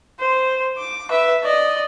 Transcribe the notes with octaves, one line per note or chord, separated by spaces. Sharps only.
C5
D6
B4 E5
D5 D#5